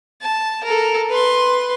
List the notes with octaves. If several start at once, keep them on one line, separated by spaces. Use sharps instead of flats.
A5
A4 A#4
B4 C6